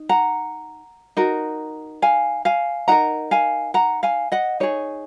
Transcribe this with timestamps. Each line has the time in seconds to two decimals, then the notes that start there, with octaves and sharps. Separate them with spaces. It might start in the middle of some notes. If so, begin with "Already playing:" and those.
Already playing: D#4
0.09 F#5 A#5
1.17 D#4 F#4 A#4
2.02 F5 G#5
2.45 F5 G#5
2.88 D#4 A#4 F#5 A#5
3.31 F5 G#5
3.74 F#5 A#5
4.03 F5 G#5
4.32 D#5 F#5
4.60 D#4 G#4 C#5